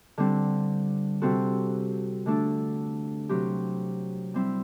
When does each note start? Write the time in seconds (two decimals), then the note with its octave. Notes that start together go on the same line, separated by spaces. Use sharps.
0.18 D3 G3 C4
1.22 C3 G3 C4 F#4 A4
2.26 D3 A3 D4 A4
3.29 C3 F#3 C4 G4
4.34 G3 C4 E4